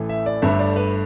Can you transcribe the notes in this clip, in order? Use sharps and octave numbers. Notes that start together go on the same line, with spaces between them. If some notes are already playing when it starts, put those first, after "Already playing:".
Already playing: A1 A2 E3 A3
E5
D5
G1 G2 D3 A3 E5
D5
B4